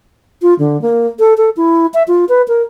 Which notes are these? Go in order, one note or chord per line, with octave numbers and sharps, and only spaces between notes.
F4
D3
A#3
A4
A4
E4
E5
F4
B4
A#4